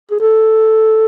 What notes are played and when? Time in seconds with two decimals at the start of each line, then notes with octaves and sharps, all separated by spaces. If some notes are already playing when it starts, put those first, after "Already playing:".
0.11 G#4
0.20 A4